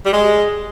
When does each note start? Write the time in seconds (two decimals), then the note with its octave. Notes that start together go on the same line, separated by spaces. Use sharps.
0.06 G3
0.13 G#3